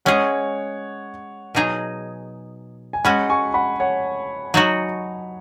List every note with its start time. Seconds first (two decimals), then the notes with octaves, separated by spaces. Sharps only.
0.05 G#3 C#4 G#4 C#5 F#5
1.55 B2 F#3 D#4 G#4
2.93 G#5
3.04 G#3 C#4 F#4 F#5 B5
3.30 G#5 C#6
3.54 F#5 B5
3.80 C#5 F#5
4.54 F#3 D#4 F#4